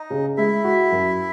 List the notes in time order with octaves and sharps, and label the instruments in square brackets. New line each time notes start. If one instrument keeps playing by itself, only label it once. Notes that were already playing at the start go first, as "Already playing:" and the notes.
Already playing: [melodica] D#4 D#5
[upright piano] C#3
[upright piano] G#3 [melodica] E4 E5
[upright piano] F#4
F#2